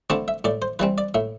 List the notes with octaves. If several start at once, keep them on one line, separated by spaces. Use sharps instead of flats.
D3 A3 C4 E4 D5
E5
A2 D5
C5
E3 G3 C4 B4
D5
A2 E5